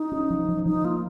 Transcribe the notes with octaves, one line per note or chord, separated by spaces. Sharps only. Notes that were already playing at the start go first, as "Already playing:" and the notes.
Already playing: D#4
C#4
F3
F3
F3 D#4
A#3 F4